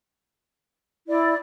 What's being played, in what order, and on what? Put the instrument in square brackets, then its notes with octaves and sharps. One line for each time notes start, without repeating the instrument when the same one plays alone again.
[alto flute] E4 [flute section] D5